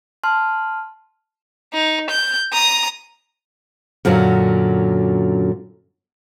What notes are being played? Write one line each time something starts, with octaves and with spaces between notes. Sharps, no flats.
A5 C6 F6
D#4
G6
A#5 D#6
F#2 A#2 D3 F#3